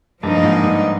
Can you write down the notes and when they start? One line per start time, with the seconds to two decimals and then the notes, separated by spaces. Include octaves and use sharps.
0.23 G2 F3 A#3 D#4
0.37 G2
0.43 G#2
0.63 G2